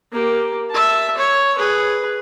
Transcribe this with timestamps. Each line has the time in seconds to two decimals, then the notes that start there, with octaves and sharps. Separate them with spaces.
0.12 A#3 G4
0.70 E5 A5
1.17 C#5
1.58 G#4 B4